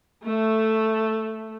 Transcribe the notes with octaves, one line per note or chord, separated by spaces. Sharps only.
A3